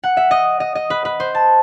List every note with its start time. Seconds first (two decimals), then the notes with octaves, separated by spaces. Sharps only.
0.04 F#5
0.17 E5
0.31 D#5
0.60 D#5
0.75 D#5
0.90 B4
1.05 B4
1.20 C5
1.35 A5